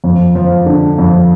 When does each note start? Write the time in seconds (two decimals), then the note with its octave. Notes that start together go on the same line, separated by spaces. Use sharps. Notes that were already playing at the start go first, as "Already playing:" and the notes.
0.04 F2
0.35 F3
0.66 D3
0.98 F2